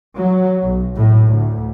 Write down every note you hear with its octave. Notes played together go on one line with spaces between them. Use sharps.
F#3
B1
A2
D2